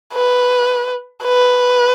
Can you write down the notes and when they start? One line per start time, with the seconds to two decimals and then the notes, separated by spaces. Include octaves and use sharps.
0.14 B4
1.23 B4